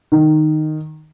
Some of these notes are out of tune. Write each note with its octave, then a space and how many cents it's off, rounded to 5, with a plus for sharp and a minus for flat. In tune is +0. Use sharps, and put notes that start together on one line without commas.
D#3 -10